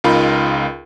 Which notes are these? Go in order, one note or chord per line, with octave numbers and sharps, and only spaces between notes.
C#2 D#4 F4 A#4 B5